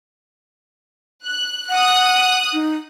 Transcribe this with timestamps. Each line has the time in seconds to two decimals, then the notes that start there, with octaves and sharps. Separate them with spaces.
1.26 F#6
1.69 F#5 D#6 F#6
2.53 D#4